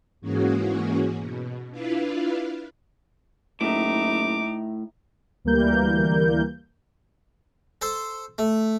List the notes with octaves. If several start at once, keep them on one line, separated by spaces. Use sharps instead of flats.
G#2 E3 A#3 C#4 F#4 G#4
B2
D4 E4 F4 B4 F5
F#1 A2 D#4 E5 A#5 D6
D2 E3 G3 A#3 A#4 G6
A4 C5
A3